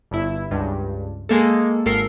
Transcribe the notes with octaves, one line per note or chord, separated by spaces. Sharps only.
G1 G2 E4
C#2 G2
G#3 A#3 A4
G#1 A4 A#4 C7